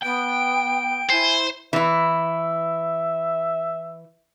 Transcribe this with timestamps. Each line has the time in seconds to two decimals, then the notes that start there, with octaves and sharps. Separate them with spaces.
0.03 B3 G5 D7
1.10 E4 C5 G#5
1.73 E3 E4 E5